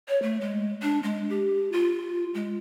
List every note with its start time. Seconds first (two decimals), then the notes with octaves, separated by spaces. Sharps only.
0.08 C#5
0.22 A3
0.41 G#3
0.82 D4
1.03 G#3
1.30 G4
1.72 F4
2.34 G#3